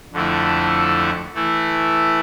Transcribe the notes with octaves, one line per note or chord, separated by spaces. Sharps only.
F2 D3 A3 E4
E3 A3 E4